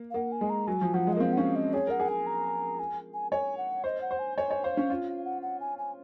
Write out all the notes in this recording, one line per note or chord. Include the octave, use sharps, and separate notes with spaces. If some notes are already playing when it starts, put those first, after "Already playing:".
Already playing: A#3
F5
A#3 F#5
G#5
G#3
A#5
F#3 G#5
F3
F3 F#5
G#3
D#5
A#3
C4 F5
F#5
C#4 F5
D#5
G#4 C#5
A#4 F#5
G#4
G#5
A#5
G#5
G#5
C#5 G#5
F#5
C5 D#5
F#5
C5
G#5
C#5 G#5
C#5
C5 F5
C#4
F4
F5
F#5
F#5
G#5
G#5